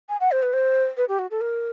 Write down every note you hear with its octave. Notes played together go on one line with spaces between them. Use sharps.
G#5
F#5
C5
B4
C5
B4
G4
F#4
A4
A#4